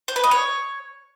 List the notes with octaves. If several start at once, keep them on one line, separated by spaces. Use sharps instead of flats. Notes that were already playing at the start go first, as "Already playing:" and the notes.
C5
B4
D#5
C#5